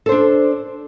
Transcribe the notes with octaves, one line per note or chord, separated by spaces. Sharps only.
D4 A4 C5